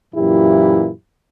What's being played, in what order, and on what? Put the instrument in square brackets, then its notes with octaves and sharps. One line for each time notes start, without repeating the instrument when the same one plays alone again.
[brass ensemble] F#2 A#2 E3 E4 G4